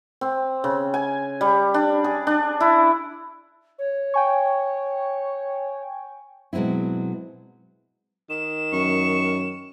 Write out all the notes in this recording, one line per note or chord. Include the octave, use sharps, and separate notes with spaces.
C4
C#3
G#5
G3
D4
G#4
D4
E4
C#5
G5 G#5 C#6
B2 F#3 G#3 C4 E4
D#3 E7
F#2 C#6